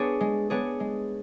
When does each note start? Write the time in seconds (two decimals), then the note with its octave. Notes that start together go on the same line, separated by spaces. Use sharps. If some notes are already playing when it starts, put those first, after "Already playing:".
Already playing: B3 D4 G#4 C#5
0.20 G#3
0.50 B3 D4 G#4 C#5
0.80 G#3